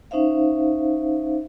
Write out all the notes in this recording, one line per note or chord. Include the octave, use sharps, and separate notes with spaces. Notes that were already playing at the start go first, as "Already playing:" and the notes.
C#4 D#4 C5 E5 F5